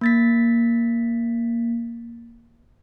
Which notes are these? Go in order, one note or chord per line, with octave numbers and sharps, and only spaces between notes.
A#3 A6 B6